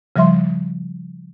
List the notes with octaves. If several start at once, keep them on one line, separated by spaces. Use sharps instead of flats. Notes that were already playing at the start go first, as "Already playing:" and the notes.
C#3 F3 G3 E5 C6